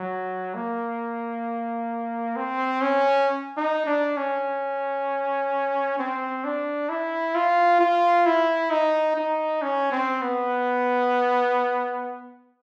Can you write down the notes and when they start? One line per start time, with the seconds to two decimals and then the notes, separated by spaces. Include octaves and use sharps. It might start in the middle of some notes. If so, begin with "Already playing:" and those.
Already playing: F#3
0.55 A#3
2.36 C4
2.82 C#4
3.57 D#4
3.86 D4
4.17 C#4
5.99 C4
6.44 D4
6.90 E4
7.35 F4
7.81 F4
8.26 E4
8.71 D#4
9.16 D#4
9.62 C#4
9.92 C4
10.22 B3